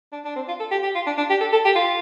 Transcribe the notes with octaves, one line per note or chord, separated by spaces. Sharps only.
D4
D4
C4
F4
A4
G4
G4
F4
D4
D4
G4
A4
A4
G4
F4